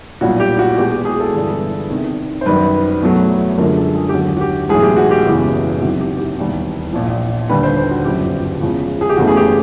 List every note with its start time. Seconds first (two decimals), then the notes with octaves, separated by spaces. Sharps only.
0.21 B1 A#2 G3 F#4
0.40 G4
0.59 F#4
0.77 E2 B2 G#3 G4
0.91 G4
1.05 G#4
1.20 A4
1.34 G1 G2 E3 G3
1.90 E2 C3 D#3
2.41 C5
2.46 F#2 D#3 G3 B4
3.01 E2 B2 F#3 A3
3.58 F#2 D3 F3 G#3 A#4
3.76 A4
3.95 G#4
4.09 G4
4.13 D#2 D3 F#3 F#4
4.37 F#4
4.41 G4
4.69 B1 A2 E3 G#3 G#4
4.83 G4
4.96 F#4
5.11 G4
5.26 F#1 E2 C#3 E3
5.81 C2 C3 D#3 F#3 F#4
6.01 G4
6.18 G4
6.37 E1 D#2 D#3 G3
6.93 A#1 A#2 F3
7.49 D#2 D3 G3 B4
7.63 C5
7.77 C5
7.91 F#4
8.05 G1 F#2 C#3 F3 G4
8.61 E2 C#3 F3 G#3
9.01 G#4
9.09 G4
9.17 F#1 E2 C#3 E3 A3 F#4
9.27 G#4
9.36 G4